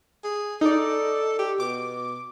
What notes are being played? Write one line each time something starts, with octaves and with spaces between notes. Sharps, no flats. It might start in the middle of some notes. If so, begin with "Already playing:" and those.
G#4
D#4 A4 D5
G4
B2 D6